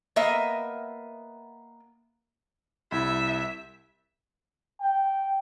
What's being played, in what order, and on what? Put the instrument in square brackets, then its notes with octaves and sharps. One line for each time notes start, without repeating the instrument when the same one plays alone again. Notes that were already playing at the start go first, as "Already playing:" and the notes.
[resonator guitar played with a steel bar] A#3 B3 D#5 E5
[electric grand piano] C2 E4 [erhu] E5
[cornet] G5